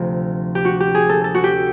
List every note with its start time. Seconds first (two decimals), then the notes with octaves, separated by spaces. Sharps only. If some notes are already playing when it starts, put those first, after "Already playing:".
Already playing: D2 C3 F3
0.55 G4
0.65 F#4
0.80 G4
0.95 G#4
1.09 A4
1.24 A4
1.35 F#4
1.44 G4